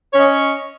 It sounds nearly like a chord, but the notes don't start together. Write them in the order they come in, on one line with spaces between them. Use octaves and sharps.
C#5 C#4 D#5